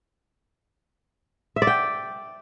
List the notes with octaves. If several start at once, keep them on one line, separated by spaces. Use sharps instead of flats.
E5
D5
G5